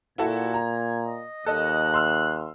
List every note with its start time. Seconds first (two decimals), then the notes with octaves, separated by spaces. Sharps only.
0.18 A#2 E4 F#4 A4 G#6
0.54 A#5
1.07 D#5
1.46 D#2 A4 D#5 F#6
1.94 C6 E6 F6